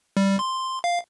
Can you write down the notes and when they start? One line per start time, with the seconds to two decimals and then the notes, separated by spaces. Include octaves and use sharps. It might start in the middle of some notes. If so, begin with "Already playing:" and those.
0.17 G3
0.39 C6
0.84 F5